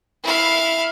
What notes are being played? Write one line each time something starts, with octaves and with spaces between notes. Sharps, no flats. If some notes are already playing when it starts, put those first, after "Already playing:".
E4 F5